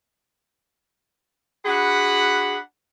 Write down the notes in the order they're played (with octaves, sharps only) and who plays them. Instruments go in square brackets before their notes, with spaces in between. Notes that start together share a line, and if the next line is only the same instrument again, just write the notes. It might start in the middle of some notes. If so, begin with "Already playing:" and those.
[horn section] D4 F#4 G#4 F#5 B5